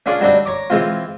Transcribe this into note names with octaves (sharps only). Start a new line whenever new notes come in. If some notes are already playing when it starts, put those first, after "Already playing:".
C#4 D4 F4 G#4 D5
F#3 G3 C4 D4 D#4
C#5 A#5 D6
E3 G#3 C4 F4